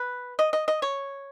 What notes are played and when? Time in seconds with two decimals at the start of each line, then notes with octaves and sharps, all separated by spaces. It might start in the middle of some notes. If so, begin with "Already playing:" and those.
Already playing: B4
0.39 D#5
0.53 D#5
0.68 D#5
0.82 C#5